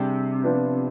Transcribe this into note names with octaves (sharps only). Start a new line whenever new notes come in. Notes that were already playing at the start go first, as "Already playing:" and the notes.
Already playing: C3 G3 D4 G#4
F3 B3 D4 F4 B4